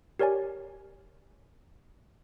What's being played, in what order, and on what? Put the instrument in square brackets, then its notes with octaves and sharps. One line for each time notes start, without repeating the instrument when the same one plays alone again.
[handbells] G4 A#4 C#5 D5 G#5